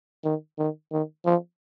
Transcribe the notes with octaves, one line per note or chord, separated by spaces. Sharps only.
D#3
D#3
D#3
F3